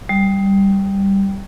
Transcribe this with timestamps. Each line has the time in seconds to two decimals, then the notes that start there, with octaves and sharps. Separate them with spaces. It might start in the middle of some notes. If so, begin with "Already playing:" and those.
0.09 G3